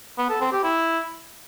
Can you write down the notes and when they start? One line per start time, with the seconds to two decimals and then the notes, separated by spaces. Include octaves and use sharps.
0.18 B3
0.30 A4
0.41 C4
0.52 G4
0.64 E4